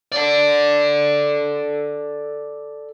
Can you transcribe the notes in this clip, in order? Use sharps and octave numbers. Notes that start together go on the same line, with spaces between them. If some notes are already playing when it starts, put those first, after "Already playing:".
A4 D5